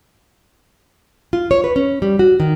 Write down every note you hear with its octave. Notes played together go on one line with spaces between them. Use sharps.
F4
C#5
B4
C#4
G3
F#4
D#3